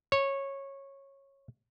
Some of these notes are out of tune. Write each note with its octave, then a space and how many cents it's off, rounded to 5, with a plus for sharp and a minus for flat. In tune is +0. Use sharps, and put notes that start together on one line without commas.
C#5 -15